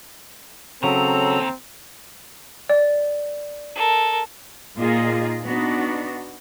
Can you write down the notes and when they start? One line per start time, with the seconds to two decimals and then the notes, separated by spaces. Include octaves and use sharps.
0.83 D#2 C#3 F#3 C4 A4 A#5
2.69 D5
3.75 A4 A#4
4.78 A#2 A#3 D#4 F4 G#4 D#5
5.45 B3 D4 D#4 F#4